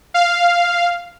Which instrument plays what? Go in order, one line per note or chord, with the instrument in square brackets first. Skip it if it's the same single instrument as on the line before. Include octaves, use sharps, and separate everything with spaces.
[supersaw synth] F5